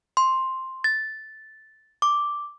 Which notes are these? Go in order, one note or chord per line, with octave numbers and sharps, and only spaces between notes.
C6
A6
D6